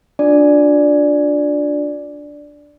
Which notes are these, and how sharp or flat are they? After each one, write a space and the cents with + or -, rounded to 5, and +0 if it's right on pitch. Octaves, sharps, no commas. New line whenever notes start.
D4 +0 F4 +40 D5 +0